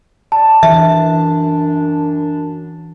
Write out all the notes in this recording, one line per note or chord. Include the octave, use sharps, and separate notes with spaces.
D5 A5
F#2 E3 D4 E5